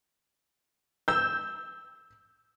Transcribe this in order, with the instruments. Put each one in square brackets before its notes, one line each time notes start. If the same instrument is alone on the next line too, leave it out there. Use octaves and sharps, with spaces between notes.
[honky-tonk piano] E6 G6